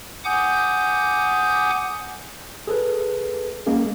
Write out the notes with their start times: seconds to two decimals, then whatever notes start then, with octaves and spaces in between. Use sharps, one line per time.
0.25 F#5 G#5 D6 D#6 G6
2.67 G#4 A4 B4
3.67 G#3 A#3 C#4 G#4